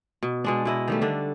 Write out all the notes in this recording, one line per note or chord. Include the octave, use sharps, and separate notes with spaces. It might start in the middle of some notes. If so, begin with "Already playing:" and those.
B2
B2 G#3 D4
B2 E4 D#5
D#3 G3 A3
D3 D4